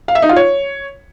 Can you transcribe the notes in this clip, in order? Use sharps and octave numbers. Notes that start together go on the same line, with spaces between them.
F5
E5
D#4
F4
C#5